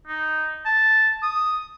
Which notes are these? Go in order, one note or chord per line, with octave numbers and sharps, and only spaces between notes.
D#4
A5
D#6